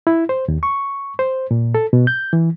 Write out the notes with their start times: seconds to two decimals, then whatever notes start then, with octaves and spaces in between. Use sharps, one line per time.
0.07 E4
0.29 C5
0.48 D#2
0.63 C#6
1.19 C5
1.51 A#2
1.75 A4
1.93 B2
2.07 G6
2.33 E3